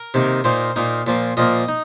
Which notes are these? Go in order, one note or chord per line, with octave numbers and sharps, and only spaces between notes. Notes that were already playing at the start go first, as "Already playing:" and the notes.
Already playing: A#4
C3 D#3 A#3 D#4
A#2 A#3 D#4 C5
A#2 A#3 D#4
A#2 F3 A#3
A#2 F3 A#3 D#5
D#4